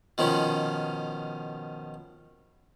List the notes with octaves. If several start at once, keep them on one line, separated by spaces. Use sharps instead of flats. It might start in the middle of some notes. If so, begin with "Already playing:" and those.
B2 D#3 F3 C#4